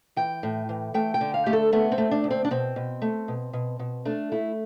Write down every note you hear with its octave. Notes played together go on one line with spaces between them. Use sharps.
E3 G5
A2
E3
A3 G5
G5
D3
F5
A3 G4
A4
A3 B3
C4
A3
D4
D2
C4
D4
B2 C4
B2
A3
B2
B2
B2
A3 D4
A3 E4